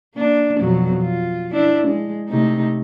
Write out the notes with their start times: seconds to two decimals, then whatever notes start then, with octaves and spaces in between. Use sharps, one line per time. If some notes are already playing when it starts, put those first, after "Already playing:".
0.15 A#3 D4
0.60 F2 B2 F#3
1.03 F4
1.52 D4 E4
1.88 G#3
2.29 C3 A3 D#4